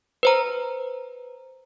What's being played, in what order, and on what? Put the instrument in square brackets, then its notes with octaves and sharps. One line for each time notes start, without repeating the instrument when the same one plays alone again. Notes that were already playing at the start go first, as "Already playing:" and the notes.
[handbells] B4 C5 A#5